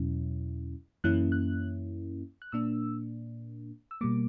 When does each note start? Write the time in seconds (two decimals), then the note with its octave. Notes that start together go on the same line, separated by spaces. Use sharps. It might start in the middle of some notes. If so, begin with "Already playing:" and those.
Already playing: E2 B2 F#3 C#4 E4
1.04 F#2 E3 A#3 C#4 E4 F#6
1.32 F#6
2.42 F#6
2.52 A#2 A#3 D4 E6
3.91 E6
4.01 B2 G3 A#3 D6